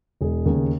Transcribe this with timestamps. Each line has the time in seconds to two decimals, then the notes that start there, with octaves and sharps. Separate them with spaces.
0.21 E1 G#4
0.45 D#2 C#3